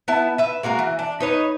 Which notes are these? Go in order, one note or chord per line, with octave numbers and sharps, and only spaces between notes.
B3 E4 A5
B4 E5
G#3 A#3 F#4 A#4
E3
D4
D#4 B4 C#5